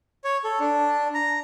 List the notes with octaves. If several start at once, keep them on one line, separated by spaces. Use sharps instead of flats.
C#5
A4
D4
A#5